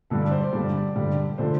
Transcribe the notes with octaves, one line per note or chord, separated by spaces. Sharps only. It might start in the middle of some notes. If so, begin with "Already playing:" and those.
G2 D3 G3 A4
D5
C5
D5
G2 D3 G3
G2 D3 G3
D3 F3 A3 C5